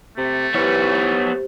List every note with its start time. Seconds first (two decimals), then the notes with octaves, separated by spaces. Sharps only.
0.18 C3 A3
0.54 E3 B3 G4 C5 C#5